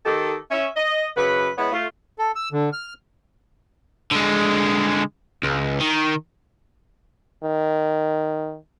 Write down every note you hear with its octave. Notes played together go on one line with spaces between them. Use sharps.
D#3 D#4 G4 A4
C#4 E5
D#5
F#2 C#3 B4
G#3 B3 E4 B4 C#5
A3 F4
A4
E6
D3
F6
D3 G#3
C#2
D#3
D#3